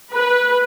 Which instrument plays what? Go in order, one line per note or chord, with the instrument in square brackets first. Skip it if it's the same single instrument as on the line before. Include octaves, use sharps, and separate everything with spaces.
[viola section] B4